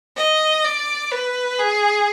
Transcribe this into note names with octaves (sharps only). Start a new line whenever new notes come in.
D#5
D5
B4
G#4